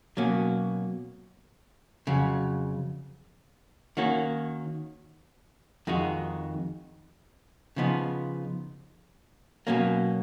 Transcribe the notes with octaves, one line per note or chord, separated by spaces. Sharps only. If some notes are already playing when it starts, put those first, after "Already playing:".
B2 F#3 A#3 C#4
F2 C#3 F#3
D#3 A#3 C#4 F#4
F2 D#3 G#3 D#4 F#4
C#3 F3 B3 D#4
B2 F#3 A#3 C#4